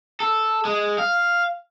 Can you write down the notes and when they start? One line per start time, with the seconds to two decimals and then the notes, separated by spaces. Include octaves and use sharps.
0.20 A4
0.65 G#3
0.98 F5